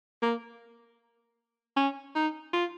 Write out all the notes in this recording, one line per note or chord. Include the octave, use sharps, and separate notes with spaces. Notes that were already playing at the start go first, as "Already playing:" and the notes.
A#3
C#4
D#4
F4